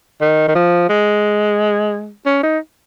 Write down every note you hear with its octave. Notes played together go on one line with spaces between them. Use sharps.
D#3
D#3
F3
G#3
C#4
D#4